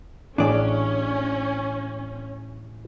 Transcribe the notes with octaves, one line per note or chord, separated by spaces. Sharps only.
A1 C#4 D4 G#4 D5